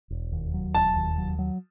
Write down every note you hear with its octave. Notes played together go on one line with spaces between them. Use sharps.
E1
D#2
F#3
E1 A5
D#2
F#3
F#3